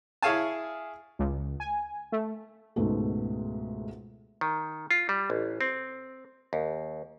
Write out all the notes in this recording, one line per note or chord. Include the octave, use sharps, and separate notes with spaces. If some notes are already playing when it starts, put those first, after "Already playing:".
E4 G#4 C#5 F5 G#5 A5
C#2
G#5
A3
C#2 G#2 B2 G#3 A3 B3
D#3
F4
G3
A1
C4
D#2